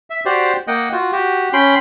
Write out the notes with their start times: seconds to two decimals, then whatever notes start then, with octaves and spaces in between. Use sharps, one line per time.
0.10 E5
0.26 F#4 G4 C5 D5
0.67 A#3 D#5 F#5 G5
0.92 F4 F#4
1.13 F#4 G4
1.53 C#4 G5 B5 C6